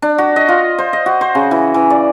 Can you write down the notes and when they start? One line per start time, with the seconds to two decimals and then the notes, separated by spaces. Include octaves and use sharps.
0.02 D4
0.18 F#4
0.36 D#5
0.49 F4
0.78 C5
0.93 D#5
1.06 F#4
1.21 C5
1.35 C#3
1.51 E3
1.74 E3
1.90 D5